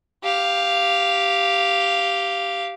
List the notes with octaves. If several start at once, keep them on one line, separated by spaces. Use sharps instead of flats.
G4 F5